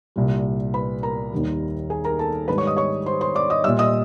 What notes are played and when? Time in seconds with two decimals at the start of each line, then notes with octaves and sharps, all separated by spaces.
0.16 C2 A#2 G3
0.74 B4 B5
1.03 A#4 A#5
1.32 D#2 D#3 G3
1.90 G#4 G#5
2.05 A#4 A#5
2.19 A4 A5
2.48 G#2 D#3 G3 B4 B5
2.58 C#5 C#6
2.67 D#5 D#6
2.77 C#5 C#6
3.06 C5 C6
3.21 C5 C6
3.35 D5 D6
3.50 D#5 D#6
3.64 A#2 G3 E5 E6
3.79 D#5 D#6